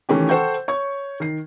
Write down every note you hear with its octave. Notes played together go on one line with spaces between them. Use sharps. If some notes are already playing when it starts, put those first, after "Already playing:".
D#3 E3 A3 C#4 G4
A4 C5 F#5 G5 C#6 G6
C#5 C#6
D#3 C7